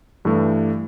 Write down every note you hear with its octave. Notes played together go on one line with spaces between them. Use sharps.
G2 E3 A3